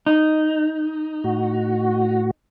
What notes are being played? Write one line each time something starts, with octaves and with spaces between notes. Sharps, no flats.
D#4
A2 F#4